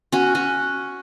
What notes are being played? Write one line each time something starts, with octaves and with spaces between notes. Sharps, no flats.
C#4 F#4
C#4 F#4